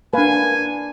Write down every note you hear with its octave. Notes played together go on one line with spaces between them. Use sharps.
A#3 D4 B4 F5 G#5